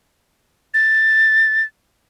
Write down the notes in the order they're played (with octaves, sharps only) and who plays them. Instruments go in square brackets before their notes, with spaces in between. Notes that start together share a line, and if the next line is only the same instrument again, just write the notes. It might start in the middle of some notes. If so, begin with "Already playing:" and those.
[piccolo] A6